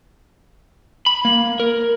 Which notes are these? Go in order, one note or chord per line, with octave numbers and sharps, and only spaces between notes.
B5
A#3
A#4